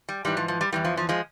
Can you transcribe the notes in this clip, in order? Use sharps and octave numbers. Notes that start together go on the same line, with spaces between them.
G3
G#2 E3 G3
F3
F3
G3
E2 C3 E3 G3
F3
F3
F3 G#3